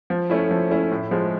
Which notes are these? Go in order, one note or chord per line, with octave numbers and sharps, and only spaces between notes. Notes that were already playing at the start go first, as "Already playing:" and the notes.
F3
A3 C#4 E4
F3
A3 C#4 E4
A2
F3 G#3